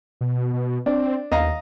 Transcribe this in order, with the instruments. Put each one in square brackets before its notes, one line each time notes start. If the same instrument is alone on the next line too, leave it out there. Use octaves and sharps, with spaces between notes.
[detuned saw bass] B2
B2
[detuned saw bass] C4 [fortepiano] D4
[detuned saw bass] D#2 [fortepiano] D#5 F5 A#5